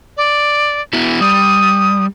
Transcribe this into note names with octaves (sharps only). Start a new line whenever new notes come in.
D5
B3 E4 F#4
G3 D#6